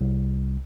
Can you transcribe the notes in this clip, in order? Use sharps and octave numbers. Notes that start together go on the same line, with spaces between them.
C2